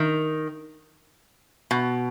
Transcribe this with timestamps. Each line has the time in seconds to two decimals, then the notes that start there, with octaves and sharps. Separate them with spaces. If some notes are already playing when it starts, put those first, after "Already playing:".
Already playing: D#3
1.71 B2